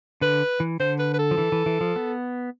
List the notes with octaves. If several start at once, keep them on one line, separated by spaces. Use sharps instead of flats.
D3 B4
E3
D3 C5
B4
B4
A4
F3
E3
E3
E3
F3
B3